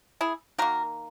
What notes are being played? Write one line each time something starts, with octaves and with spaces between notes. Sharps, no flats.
E4 G#4
D#3 A#3 F#4 A#4